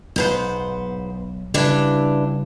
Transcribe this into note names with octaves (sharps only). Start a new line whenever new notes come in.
B1 G#2 B3 C5
C#3 E3 G3 D4 G4